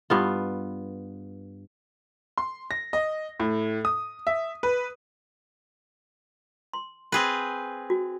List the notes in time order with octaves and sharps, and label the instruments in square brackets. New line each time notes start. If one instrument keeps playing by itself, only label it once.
[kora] G2 B3 F4
[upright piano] C6
A#6
D#5
A2
D#6
E5
B4
[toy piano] C6
[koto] C4 G#4 B4
[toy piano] F#4